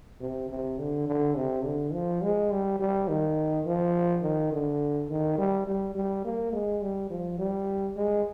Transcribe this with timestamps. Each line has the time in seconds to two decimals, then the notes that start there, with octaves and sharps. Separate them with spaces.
0.21 C3
0.50 C3
0.79 D3
1.07 D3
1.37 C3
1.65 D3
1.93 F3
2.22 G#3
2.51 G3
2.79 G3
3.08 D#3
3.65 F3
4.23 D#3
4.52 D3
5.09 D#3
5.38 G3
5.67 G3
5.95 G3
6.25 A#3
6.53 G#3
6.82 G3
7.10 F3
7.38 G3
7.96 G#3